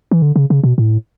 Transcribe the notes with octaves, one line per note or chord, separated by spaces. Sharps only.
E3
D3
C#3
C#3
B2
A2